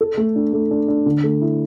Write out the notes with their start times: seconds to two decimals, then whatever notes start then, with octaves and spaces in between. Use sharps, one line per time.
0.01 A4
0.17 A3
0.36 D4
0.53 A3
0.71 D4
0.88 D4
1.06 D3
1.23 A3
1.41 E4